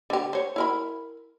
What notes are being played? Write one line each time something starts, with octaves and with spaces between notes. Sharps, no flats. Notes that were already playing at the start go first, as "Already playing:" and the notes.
D3 G4
C5 C#5
E4 A#4 B5